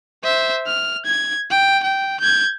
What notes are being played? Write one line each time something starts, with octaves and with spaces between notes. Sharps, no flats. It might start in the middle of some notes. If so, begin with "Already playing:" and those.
C5 E5
F6
G#6
G5
G5
G6 G#6